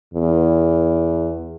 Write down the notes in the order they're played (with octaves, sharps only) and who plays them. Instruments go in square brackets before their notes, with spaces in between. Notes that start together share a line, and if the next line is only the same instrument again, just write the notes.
[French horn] E2